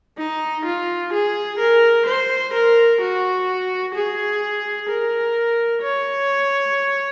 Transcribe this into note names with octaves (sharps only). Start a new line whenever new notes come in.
D#4
F4
G#4
A#4
C5
A#4
F#4
G#4
A#4
C#5